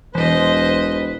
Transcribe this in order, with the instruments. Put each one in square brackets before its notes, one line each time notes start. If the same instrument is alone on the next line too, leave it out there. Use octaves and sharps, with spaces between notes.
[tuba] E1 [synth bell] E3 [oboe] B4 [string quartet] C5 D#5